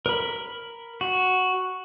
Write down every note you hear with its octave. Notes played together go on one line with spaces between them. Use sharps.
A#4 B5
F#4